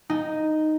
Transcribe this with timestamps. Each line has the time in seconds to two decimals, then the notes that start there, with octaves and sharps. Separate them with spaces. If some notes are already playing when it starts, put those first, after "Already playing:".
0.10 D#4